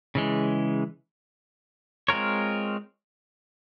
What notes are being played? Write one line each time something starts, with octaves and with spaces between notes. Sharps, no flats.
C#3 E3 G#3
G#3 C4 F4 A#4 C#5